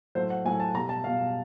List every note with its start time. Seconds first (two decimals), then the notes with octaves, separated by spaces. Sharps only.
0.15 A2 F#3 A3 C5
0.30 F#5
0.45 A2 F#3 A3 G#5
0.60 A5
0.74 B2 A#5
0.77 G3
0.89 A5
1.04 B2 G3 F5